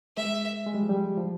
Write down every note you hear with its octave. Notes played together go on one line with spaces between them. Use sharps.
G#3 E5
G#3
G3
F3
G3
F3